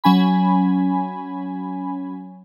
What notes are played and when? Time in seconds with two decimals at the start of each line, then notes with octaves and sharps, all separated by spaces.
0.04 F#3 C#4 G#5 B5